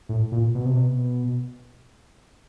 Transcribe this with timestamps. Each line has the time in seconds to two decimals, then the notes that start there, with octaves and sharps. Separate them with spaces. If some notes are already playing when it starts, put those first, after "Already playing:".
0.09 A2
0.32 A#2
0.55 B2
0.65 C3
0.76 B2